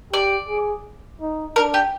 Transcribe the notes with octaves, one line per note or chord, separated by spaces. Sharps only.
G4 D5
G#4
D#4
D4 A#4
G4